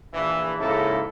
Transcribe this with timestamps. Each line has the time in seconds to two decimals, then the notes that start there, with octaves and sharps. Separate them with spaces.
0.13 A#1 E3
0.58 C#2 G#2 C#3 A#3 E4 A4